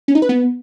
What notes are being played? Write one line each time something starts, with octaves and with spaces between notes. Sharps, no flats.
C#4
D#4
B4
B3